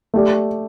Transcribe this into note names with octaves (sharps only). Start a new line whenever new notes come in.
A3 G4 D5